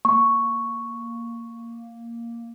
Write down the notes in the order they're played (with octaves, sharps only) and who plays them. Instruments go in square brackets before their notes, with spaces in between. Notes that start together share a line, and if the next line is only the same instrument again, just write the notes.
[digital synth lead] A#3 [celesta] C#6